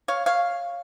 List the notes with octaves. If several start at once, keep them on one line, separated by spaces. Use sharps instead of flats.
C#5 F5
C#5 F5